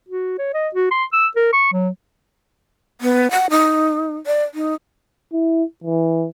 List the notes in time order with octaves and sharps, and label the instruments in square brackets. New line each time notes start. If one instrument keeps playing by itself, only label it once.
[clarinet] F#4
C#5
D#5
F#4
C6
E6
A#4
C#6
F#3
[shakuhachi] B3
F#5
D#4
D5
D#4
[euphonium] E4
E3